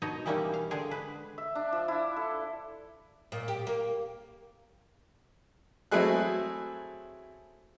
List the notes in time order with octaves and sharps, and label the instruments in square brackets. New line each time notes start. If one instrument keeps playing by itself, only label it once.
[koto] B2 D#4 C#5 D#5
E3 G3 A#3 C#4 D#4
F5
D3 G#3 G#4 G5
B4
[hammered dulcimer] E5
D4
F3
E4
A4
[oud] A#2
G4
A#3
[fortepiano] F#3 A3 C4 E4 G#4 F#6